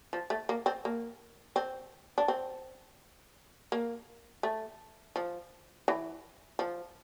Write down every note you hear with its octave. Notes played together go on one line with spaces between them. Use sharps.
F3
A3
A#3
C4
A#3
C4
D4
C4
A#3
A3
F3
E3
F3